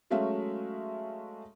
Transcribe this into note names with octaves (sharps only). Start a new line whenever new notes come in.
F#3 G#3 A3 C#4 E5 F5